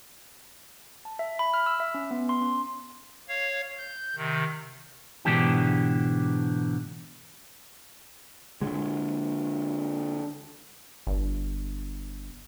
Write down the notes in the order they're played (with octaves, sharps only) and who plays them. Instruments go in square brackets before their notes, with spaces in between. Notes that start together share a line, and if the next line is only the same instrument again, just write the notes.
[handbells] A5
E5
B5
F6
E6
E5
C#4
B3
C6
C#4
[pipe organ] C#5 F5
G6
C3 D#3
[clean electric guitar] G#2 B2 D3 E3 D4 G4
[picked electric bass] D3 G#3
[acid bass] G1